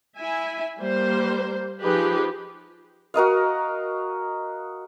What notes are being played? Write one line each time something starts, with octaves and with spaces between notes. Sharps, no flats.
E4 E5 G#5
G3 A#3 C5
F3 D#4 G4 G#4 B4
F#4 A#4 D#5 F5